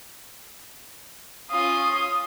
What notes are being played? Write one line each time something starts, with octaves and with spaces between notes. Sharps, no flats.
C#4 F4 D#6